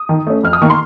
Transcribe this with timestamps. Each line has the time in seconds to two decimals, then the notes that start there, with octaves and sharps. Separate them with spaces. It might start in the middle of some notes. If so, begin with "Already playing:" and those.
Already playing: D#6
0.09 D#3
0.27 A3 C#4
0.43 F2 F6
0.53 D#6
0.62 D#3 A#3 C#6
0.70 C6